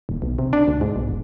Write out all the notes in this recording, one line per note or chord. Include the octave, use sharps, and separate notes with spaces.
D#1
B1
C3
D4
D2
G#2
B1
E1